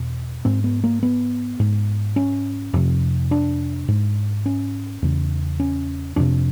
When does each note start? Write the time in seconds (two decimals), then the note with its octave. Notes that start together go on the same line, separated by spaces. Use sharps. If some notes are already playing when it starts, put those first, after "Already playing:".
Already playing: E2 B2
0.45 G#2 C4
0.64 B3
0.84 A#3
1.03 B3
1.60 G#2
2.16 C#4
2.74 F2 C3
3.31 D4
3.88 G#2
4.46 C#4
5.02 E2 C#3
5.60 C#4
6.16 F2 C3 D4